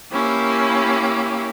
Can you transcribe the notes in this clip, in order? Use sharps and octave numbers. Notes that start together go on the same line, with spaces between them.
A#3 C#4 E4 G4